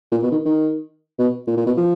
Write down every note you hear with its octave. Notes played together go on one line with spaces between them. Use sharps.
A#2
B2
D#3
D#3
B2
A#2
A#2
B2
F3